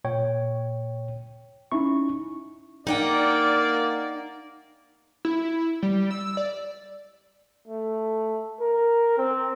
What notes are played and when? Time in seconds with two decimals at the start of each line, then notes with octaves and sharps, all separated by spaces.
0.05 A#2 C#5 G5
1.72 C#4 D#4 E4 C#6
2.87 A#3 D#4 D5 F#5 G5
5.25 E4
5.83 G3
6.11 E6
6.37 D5
7.68 A3
8.61 A#4
9.18 C4